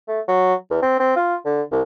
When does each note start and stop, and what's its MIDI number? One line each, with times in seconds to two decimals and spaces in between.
0.08 0.20 57
0.28 0.54 54
0.71 0.77 40
0.82 0.98 60
0.99 1.15 60
1.16 1.36 65
1.45 1.62 50
1.71 1.81 36